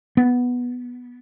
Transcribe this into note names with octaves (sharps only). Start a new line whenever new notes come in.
B3